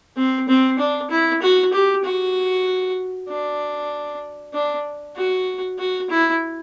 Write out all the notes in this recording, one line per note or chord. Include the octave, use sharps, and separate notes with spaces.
C4
C4
D4
E4
F#4
G4
F#4
D4
D4
F#4
F#4
E4